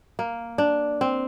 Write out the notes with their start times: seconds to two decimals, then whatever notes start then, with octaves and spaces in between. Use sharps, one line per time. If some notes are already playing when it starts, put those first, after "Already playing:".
0.19 A#3
0.58 D4
1.01 C4